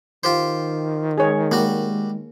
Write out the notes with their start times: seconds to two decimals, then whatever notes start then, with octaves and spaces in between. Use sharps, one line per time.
0.24 D#3 F4 G4 C5
1.18 G#3 G#4 C#5
1.52 G3 G#3 A#3 F#4